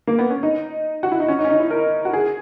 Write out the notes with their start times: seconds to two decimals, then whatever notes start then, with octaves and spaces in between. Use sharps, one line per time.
0.07 A#3
0.19 B3
0.30 C#4
0.43 D#4
1.03 F#4
1.12 E4
1.20 D#4
1.28 C#4
1.39 D#4
1.44 C#4
1.50 D#4
1.60 E4
1.71 A#4
2.05 F#4
2.13 G#4